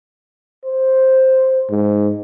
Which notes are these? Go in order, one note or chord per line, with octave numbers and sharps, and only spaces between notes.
C5
G#2